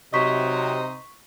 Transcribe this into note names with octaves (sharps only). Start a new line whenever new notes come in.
C3 F#3 D#4 C5 D#5 C#6 B6